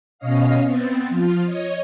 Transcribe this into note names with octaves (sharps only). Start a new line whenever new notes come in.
B2 C#4 C#5 D#5 F5
B3 C4 A6
F3 F4
C#5 D#5 G#6